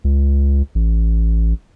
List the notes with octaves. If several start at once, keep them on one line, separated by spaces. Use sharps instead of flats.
C#2
A1